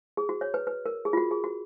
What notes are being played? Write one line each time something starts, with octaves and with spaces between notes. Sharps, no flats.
G#4
F#4
C#5
B4
B4
A#4
G#4
F4
F#4
G#4
F#4